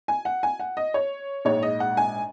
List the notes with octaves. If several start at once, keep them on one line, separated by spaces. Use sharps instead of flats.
G#5
F#5
G#5
F#5
D#5
C#5
A#1 G#2 G#3 C#5
D#5
F#5
G#5